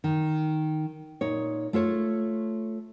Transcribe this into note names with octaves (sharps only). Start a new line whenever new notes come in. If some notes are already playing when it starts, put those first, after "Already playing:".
D#3
A#2 D#4 C#5
A3 F4 A4 C#5